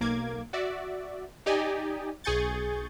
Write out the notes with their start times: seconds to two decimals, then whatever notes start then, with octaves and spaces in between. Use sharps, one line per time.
0.01 B1 A#3 D6 G#6
0.53 F#4 D5 E5
1.46 D#4 G4 D5 D#5 G#5
2.24 B1 G#4 G#5 C#6 G6 A6